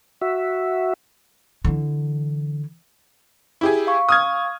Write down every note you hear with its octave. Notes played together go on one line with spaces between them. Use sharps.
F#4 E5
D3 E3
E4 G4 G#4
F5 C#6
D#6 F6 G#6